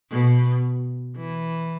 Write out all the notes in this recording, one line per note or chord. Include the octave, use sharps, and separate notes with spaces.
B2
E3